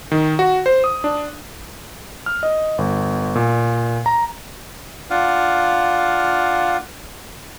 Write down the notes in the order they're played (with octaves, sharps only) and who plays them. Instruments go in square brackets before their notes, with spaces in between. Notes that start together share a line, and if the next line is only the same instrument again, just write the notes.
[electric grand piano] D#3
F#4
C5
D#6
D4
F6
D#5
G1
A#2
A#5
[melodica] D4 F4 F5 F#5